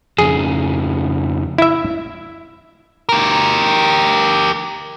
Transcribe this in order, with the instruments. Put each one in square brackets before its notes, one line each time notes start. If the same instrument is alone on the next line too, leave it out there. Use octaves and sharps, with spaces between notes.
[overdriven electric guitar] F2 C#3 [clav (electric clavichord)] G#4
[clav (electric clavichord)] E4 E5
[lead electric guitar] G4 A#4